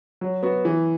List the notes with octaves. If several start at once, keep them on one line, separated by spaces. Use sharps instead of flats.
F#3
B3 F#4
E3